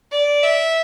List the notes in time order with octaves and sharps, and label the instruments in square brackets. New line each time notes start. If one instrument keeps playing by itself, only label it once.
[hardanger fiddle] D5
E5